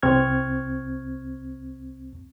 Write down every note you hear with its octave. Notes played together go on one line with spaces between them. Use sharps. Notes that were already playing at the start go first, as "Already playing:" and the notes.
C2 C4 C#6 F6 G#6